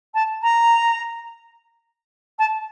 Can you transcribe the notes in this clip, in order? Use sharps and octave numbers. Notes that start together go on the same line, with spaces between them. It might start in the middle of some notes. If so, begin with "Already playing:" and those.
A5
A#5
A5